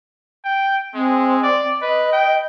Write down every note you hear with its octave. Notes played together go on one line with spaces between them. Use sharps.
G5
G#3 C4
D5
B4 D#5
G5